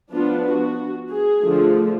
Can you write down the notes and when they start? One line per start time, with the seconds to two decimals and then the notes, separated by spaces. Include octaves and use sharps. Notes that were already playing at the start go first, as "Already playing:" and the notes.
0.13 F3 B3 D4 F4
0.47 F#4
1.12 G#4
1.44 D3 F3 A3